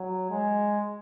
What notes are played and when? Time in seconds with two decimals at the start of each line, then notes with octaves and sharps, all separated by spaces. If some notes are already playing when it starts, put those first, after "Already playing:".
Already playing: F#3
0.30 G#3